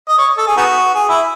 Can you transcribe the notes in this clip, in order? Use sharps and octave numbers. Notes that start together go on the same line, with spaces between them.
D#5
C#5
A4
G#4
B3 D#4 F#4
G#4
E4